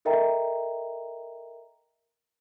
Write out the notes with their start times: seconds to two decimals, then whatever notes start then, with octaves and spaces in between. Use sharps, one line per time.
0.05 A4 A#4 D#5 E5 G5 A#5